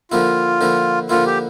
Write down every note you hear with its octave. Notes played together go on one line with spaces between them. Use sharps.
D3 F3 A#3 E4 F4
D3 F3 A#3 E4
D3 F3 A#3 E4 F4
G4